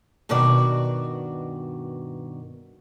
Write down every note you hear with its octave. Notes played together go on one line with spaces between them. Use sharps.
G2 B2 D#3 F#4 D5